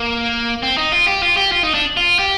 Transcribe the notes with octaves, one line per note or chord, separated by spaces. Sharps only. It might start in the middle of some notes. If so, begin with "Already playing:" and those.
Already playing: A#3
C4
D#4
F4
G4
F4
G4
F4
D#4
D4
F4
G4